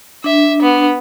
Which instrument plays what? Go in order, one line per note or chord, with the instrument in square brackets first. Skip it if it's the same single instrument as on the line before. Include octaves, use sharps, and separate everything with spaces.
[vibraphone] D4 [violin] E5
[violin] B3